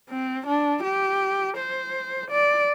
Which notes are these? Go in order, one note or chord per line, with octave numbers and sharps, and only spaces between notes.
C4
D4
G4
C5
D5